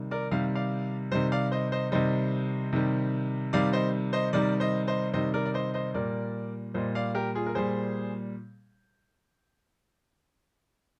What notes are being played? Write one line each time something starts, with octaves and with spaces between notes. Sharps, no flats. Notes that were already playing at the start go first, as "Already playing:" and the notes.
Already playing: C3 D#3 G3
A#4 D5
C3 D#3 G3 F5
D5 F5
C3 D#3 G3 C5 D#5
D5 F5
C5 D#5
C5 D#5
C3 D#3 G3 C5 D#5
C3 D#3 G3
C3 D#3 G3 D5 F5
C5 D#5
C5 D#5
C3 D#3 G3 A#4 D5
C5 D#5
C5 D#5
C3 D#3 G3 C5 D#5
A#4 D5
D5
C5 D#5
C5 D#5
A#2 G3 A#4 D5
A#2 G3 C5 D#5
D5 F5
G4 A#4
F4 G#4
A#4
A#2 G3 G#4 C5